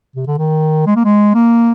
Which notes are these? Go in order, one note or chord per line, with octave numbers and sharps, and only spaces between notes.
C3
D3
D#3
G#3
A#3
G#3
A#3